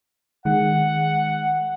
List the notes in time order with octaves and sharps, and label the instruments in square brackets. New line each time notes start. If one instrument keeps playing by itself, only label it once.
[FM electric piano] D#3 G#3 [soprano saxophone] F#5